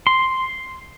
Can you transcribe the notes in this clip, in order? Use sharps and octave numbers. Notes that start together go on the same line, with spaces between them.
C6